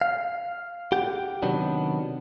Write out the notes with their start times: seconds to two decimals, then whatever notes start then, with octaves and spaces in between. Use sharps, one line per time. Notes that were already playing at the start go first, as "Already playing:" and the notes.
0.01 F5
0.92 G4 F#5 G5
1.42 C3 D#3 F#3 B3 D4